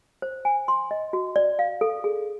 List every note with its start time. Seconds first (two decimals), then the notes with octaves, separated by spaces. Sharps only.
0.22 C5
0.45 G#5
0.68 C6
0.91 D#5
1.13 F#4
1.36 D5
1.59 F5
1.81 A4
2.04 G#4